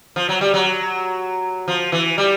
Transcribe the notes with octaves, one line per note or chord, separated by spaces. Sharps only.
F3
F#3
G3
F#3
F3
E3
G3